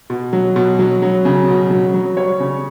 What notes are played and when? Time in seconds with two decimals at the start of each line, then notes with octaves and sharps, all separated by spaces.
0.10 B2
0.33 F#3
0.56 B2
0.79 F#3
1.02 F#3
1.25 C#3
1.48 B2
1.71 F#3
1.94 F#3
2.17 G3 C#5
2.40 C#3